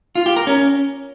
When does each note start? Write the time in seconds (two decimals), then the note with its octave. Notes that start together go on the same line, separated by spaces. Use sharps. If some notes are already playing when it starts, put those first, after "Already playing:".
0.15 F4
0.26 G4
0.36 A#4
0.47 C#4